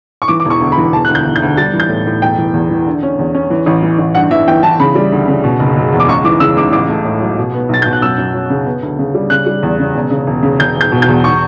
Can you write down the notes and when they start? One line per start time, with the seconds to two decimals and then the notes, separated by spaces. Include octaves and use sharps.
0.22 C#6
0.28 E3 D6
0.40 D6
0.45 E1
0.50 C#6
0.60 D2
0.72 B5
0.77 E3
0.93 E1 A5
1.05 D2 F#6
1.15 G6
1.26 E1
1.36 G6
1.42 D2
1.57 G3 A6
1.73 E3
1.80 G6
1.89 A2
2.06 A2
2.21 E1 G5
2.38 E3
2.54 E2
2.71 E3
2.86 D3
3.03 C#4
3.19 E2
3.35 C#4
3.50 E3
3.66 A1
3.83 E3
3.98 A1
4.15 G2 F#5
4.31 E3 E5
4.48 E3 G5
4.63 E3 A5
4.80 C#3 B5
4.95 G3
5.12 D2
5.28 C#3
5.44 B2
5.60 F#1
5.76 F#1
5.92 E2
6.00 D6
6.08 C#2 C#6
6.24 E3 D6
6.40 C#3 E6
6.57 C#2 D6
6.72 A1 D6
6.89 A3
7.05 A2
7.21 F#3
7.38 B2
7.53 B3
7.69 B1 A6
7.82 B2 G6
7.93 F#6
8.02 F#2 E6
8.18 F#2
8.34 F#3
8.50 C#3
8.66 B3
8.83 D2
8.99 C#3
9.15 G3
9.30 C#3 F#6
9.46 G3
9.63 E2
9.79 C#3
9.94 E1
10.11 C#3
10.27 E1
10.43 C#3
10.59 E1 G6
10.76 E1 G6
10.92 B2
11.02 G6
11.08 E2
11.24 C#6